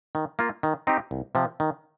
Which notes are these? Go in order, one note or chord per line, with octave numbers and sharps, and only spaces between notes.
D#3
A#3 F4
D#3
C4 D#4 G4
C2
C3 F3
D#3